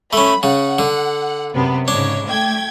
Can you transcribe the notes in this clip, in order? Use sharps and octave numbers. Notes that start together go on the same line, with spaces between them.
A3 C#4 B5
C#3 F#5
D3
F#2 C3 B3
G#2 C#3 D4 C#5
A3 G5 G#6